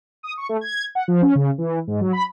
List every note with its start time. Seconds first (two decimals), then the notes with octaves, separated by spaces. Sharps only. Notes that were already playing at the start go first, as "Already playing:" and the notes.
0.23 D#6
0.37 C#6
0.49 A3
0.61 G#6
0.95 F#5
1.08 F3
1.22 C#4
1.35 C#3
1.58 E3
1.87 G#2
2.01 F#3
2.13 B5